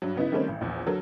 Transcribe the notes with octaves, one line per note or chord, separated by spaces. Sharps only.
G2 F#3
C#3 B3 D#4 E4
D#3 G3 A3 A#3 C4 C#4
A1
A#1 E2
D3 F#3 A4 A#4